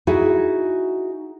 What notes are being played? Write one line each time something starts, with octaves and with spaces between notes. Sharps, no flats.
D#4 E4 F#4 G#4 E5